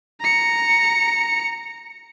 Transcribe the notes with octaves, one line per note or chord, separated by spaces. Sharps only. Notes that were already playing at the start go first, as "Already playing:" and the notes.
A#5 C#7